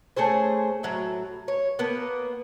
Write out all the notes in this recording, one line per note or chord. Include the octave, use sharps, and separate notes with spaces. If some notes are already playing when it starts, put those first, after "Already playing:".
A3 C#4 G#4 C5
A2 F#3 E5
C#5
A#3 B3